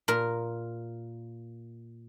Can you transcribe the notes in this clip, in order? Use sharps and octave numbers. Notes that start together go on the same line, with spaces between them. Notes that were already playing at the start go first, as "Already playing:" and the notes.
A#2 A#4